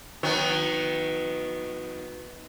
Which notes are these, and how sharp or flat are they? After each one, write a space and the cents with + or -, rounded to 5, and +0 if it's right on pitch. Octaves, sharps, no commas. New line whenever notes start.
D#3 +15 F#3 -30 B3 +0